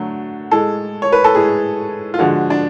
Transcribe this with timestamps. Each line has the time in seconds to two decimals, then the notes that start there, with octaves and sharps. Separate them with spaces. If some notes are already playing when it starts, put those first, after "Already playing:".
Already playing: D3 F#3 A3
0.51 A2 G#3 A4
1.02 C#5
1.12 B4
1.24 A4
1.35 A2 G#3 G#4
2.14 F4
2.19 D3 F3 G#3 F#4
2.50 D4